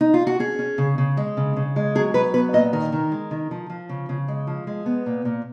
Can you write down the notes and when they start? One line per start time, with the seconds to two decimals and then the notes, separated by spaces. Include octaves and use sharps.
0.01 D#4
0.14 F4
0.27 F#4
0.40 C#4 G#4
0.59 C#4
0.78 C#3
0.98 C#3
1.17 G#3
1.37 C#3
1.56 C#3
1.76 G#3
1.95 F#3 G#4
2.14 F#3 B4
2.34 B3 B4
2.53 A#2 D#5
2.73 D#3 A#4
2.92 D#3
3.12 G#3
3.31 D#3
3.51 F3
3.70 F3
3.89 C#3
4.09 C#3
4.28 G#3
4.47 F3
4.67 G#3
4.86 B3
5.06 A#2
5.25 A#2